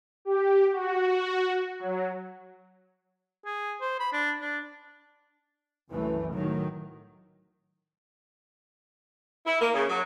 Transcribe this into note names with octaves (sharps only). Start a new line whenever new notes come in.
G4
F#4
F#3
G#4
C5
B5
D4
D4
C2 F#2 E3 A3
A2 D#3 F#3
E4
A#3
C#3
F#3